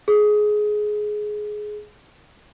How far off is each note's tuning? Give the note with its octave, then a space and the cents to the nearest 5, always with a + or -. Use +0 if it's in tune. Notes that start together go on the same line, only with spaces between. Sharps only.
G#4 +15